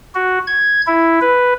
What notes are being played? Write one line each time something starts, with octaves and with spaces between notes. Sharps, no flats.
F#4
G#6
E4
B4